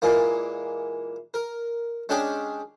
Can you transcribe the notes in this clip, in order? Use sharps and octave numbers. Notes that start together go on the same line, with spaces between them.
A#2 E3 G#3 A#3
A#4
G#3 C#4 D4 G4 G#4